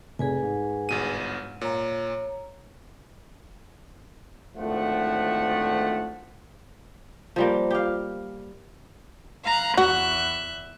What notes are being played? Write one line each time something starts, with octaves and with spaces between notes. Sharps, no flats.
F1 G#4 B4 G#5
G#2
G1 B2 D#7
A#2 C#5 A#5
G#1 D2 A2 F3 A3 F#5
F3 G3 A#3
G4 F5
F5 A#5 F#6
E2 F#4 E5 F#6